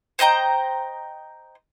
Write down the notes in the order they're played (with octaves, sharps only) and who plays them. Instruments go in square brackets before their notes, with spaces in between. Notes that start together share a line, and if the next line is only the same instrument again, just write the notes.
[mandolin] C5 D#5 G5 A#5